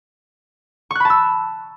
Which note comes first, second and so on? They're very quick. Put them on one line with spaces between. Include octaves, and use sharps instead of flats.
C#6 F#6 B5 A5 E6